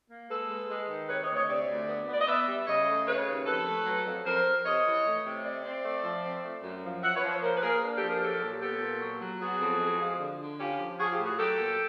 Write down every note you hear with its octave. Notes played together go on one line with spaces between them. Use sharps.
A#3
G#3 A4 B4
G#3
G#3
D#3
C3 B4 C#5
C#5 D#5
D2
C#5 D#5
C3 D5 E5
D2
B3
B3
D5
D#5
B3 D5 E5
G3
C#3 C#5 D#5
A3
C#3 B4 C#5
D#2
F2 A4 B4
A3
F#3
F2
F2 A#4 C5
F2
C3 C#5 D#5
E3
A3
C3
C4 D5 E5
C4
A3
F3
C4
A3
F#2
F3
F3 E5 F#5
B4 C#5
F3
B4 C#5
A#3 A#4 C5
B4
A#3 G#4 A#4
D4
G4 A4
F3
G#4 A#4
F#3 G4 A4
A#2
B3 G4 A4
A#2
F#3
F#3
B3 F#4 G#4
F2
G#3
F3
D3
D3
C#4 F4 G4
F3
F3 F#4 G#4
F4 G4
A2
F#4 G#4
F#3 G4 A4
A#2